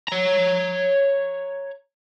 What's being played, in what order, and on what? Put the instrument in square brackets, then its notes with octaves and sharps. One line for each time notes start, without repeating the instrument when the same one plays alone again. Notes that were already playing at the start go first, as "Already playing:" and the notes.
[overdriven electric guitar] C#5 A#5